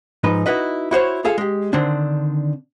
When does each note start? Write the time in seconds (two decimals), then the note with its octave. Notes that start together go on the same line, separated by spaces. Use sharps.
0.24 G#2 F3 D#4 B4
0.46 D#4 E4 F#4 B4 D#5
0.91 E4 F#4 C5 C#5
1.24 F4 G#4 A4 F5
1.38 G#3 G4
1.73 D3 D#3 C4 D4